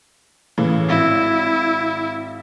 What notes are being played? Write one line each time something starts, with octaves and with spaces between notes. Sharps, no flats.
A2 C#3 E3
G#1 E4